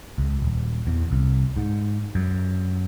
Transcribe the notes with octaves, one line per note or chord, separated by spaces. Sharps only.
C#2
D#1
E2
C2
G#2
F#2